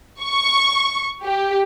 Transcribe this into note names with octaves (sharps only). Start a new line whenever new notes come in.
C#6
G4